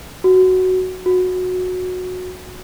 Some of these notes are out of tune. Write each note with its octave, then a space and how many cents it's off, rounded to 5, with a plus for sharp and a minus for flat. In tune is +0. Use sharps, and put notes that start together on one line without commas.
F#4 +5
F#4 -15